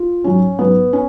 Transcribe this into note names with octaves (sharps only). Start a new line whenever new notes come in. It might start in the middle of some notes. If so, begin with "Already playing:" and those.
Already playing: F4
G#2 F#3 C#4
G#2 F#3 B3
C#4